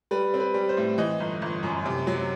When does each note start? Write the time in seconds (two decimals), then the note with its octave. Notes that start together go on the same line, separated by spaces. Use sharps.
0.11 G3 B4
0.34 C4
0.40 B4
0.54 G3
0.69 C5
0.77 A2
0.98 E3 D#5
1.20 G1
1.42 G1
1.63 F#2
1.85 C3
2.07 F#3